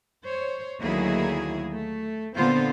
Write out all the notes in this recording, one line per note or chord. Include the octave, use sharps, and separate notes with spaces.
C5 C#5
D2 D#3 F#3 A#3 E4 G#4
A3
A#2 D3 B3 C4 F4 C5